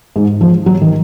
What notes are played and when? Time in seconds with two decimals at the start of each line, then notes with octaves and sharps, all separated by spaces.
0.16 G#2
0.41 F3
0.66 F#3
0.82 D#3